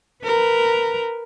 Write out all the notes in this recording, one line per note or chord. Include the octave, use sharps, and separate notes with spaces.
A#4 B4